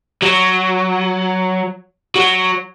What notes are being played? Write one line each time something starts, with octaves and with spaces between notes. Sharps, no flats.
F#3
F#3